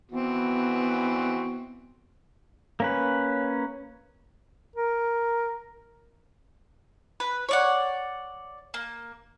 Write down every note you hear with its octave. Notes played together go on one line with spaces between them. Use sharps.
E3 B3 C4 F#4
A#3 C#4 B4
A#4
B4
C#5 D5 F#5
A#3